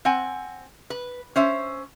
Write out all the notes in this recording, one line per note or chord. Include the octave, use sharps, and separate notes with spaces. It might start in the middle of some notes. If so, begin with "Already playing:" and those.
C4 F#5 G#5
B4
C#4 C5 E5